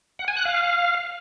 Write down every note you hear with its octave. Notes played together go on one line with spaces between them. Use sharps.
F#5
G#5
F#6
F5